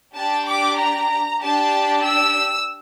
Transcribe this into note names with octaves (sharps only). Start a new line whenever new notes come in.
D4 G4 A5
D6
A#5
D4 G4 A5
E6